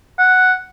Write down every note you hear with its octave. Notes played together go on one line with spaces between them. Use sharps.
F#5